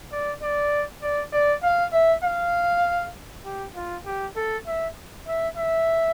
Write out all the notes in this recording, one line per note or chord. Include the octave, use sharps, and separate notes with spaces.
D5
D5
D5
D5
F5
E5
F5
G4
F4
G4
A4
E5
E5
E5